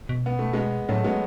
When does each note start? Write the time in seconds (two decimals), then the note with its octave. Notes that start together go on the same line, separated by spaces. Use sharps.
0.09 B2
0.26 B3
0.39 A3
0.53 G#3 B3
0.89 A2 F#3 A3
1.04 G#3 B3